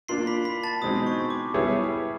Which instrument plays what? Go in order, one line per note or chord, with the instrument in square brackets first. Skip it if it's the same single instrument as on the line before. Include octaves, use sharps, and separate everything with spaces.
[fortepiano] A#3 D4 F4 A#4 [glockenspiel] C6 C7
[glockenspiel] B5 B6
B5 B6
A5 A6
[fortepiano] B2 G#3 C4 D#4 [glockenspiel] D#6
[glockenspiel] C#6
D6
[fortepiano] G3 B3 E4 G#4 C#5